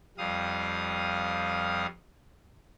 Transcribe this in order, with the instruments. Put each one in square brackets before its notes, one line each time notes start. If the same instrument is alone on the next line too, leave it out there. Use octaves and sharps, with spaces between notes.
[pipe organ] F2 G3 F5 D#6